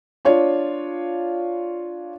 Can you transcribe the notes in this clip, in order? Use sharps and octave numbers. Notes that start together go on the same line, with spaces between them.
D4 F4 C#5